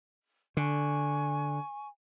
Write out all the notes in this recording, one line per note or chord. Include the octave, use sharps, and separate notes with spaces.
D3 G#5 C#6